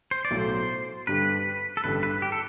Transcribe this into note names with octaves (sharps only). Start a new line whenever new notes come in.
C5
D5
B1 A2 F#3 A3
C5
G2 D3 G3 B4
A4
A1 G2 D3 G3 B4
B4
G4
A4